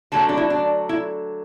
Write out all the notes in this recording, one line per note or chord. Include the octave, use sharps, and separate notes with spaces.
D3 F#3 A3 A5
D4
E4
D4
E4